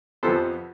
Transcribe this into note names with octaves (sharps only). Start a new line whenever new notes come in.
F2 C3 F3 B3 A4 C5